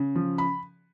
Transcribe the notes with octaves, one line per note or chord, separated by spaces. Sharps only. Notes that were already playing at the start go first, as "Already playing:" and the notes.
Already playing: C#3
F3
B5